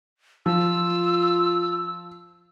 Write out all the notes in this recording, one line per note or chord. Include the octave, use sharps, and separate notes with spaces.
F3 F4 E6